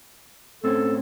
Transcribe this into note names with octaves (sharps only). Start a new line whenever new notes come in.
A2 C4 C#4 A4